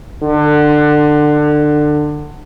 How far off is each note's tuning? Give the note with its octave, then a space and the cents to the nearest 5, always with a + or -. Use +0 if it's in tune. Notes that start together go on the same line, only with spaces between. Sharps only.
D3 +20